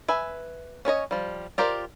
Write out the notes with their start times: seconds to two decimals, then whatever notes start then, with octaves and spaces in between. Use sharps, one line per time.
0.08 B4 E5 G#5
0.85 C#4 D4 C#5 D#5
1.11 F3 G3
1.58 F4 G4 A#4 C5 D5